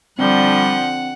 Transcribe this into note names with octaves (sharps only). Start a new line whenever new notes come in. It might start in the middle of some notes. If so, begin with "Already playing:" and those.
D3 F3 G3 C4 F#5 G6